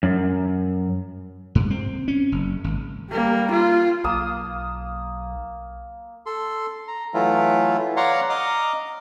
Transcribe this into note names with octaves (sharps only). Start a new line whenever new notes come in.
F#2
G2
C4
C#4
F#1
G#1
G3 A#3
F4
B1 A#3 A5 D#6
A4 C6
A#5
E3 F#3 A3 E4 F4
C#5 D5 F5 F#5 A#5 C6
D#5 A#5 D6 D#6 F6